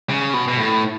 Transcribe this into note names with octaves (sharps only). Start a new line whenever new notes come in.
C#3
B2
B2
A2